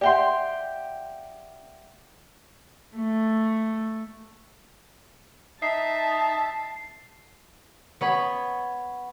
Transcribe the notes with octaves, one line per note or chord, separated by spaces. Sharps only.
G4 D5 E5 F#5 G5 C6
A3
D#4 E5 A5 C7
B3 C#5 B5